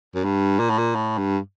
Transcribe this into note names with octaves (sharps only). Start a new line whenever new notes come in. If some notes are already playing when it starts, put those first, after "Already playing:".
F#2
G2
A#2
A2
A#2
A2
G2